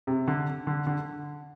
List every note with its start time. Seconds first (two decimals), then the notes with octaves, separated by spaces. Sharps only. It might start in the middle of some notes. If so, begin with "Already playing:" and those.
0.07 C3
0.28 D3
0.67 D3
0.87 D3